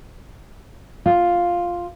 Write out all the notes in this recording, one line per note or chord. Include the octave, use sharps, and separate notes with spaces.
F4